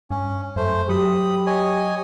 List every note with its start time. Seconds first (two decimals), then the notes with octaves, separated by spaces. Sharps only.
0.11 G2 C#4
0.56 F#2 A3 C5
0.89 F#3 G4 B5 D#6
1.46 C#5 D#5 G#5